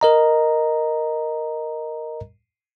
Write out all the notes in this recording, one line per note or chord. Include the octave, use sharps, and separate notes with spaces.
A#4 D#5 A#5